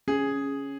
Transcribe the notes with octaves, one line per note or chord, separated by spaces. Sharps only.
C#4 G#4